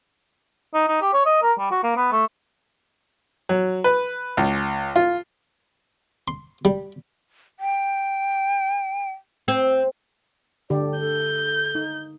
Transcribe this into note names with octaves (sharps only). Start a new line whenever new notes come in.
D#4
D#4
G4
C#5
D#5
A#4
G3
F#4
A#3
B3
A3
F#3
B4
C#2
F4
C6
G3
G5
C4
D3 G4 D5
A4 G6
D#4